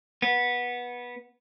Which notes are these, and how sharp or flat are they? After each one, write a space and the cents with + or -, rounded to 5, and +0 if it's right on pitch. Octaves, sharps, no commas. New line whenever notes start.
B3 -15